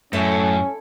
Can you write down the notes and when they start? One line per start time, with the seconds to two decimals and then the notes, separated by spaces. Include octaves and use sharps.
0.13 F#2 A2 C#4 E4 A4